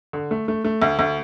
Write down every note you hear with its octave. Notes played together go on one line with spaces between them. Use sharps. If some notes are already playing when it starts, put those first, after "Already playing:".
D3
A3
A3
A3
D2
D2